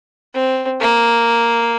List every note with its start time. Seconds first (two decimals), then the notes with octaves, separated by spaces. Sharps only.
0.34 C4
0.81 A#3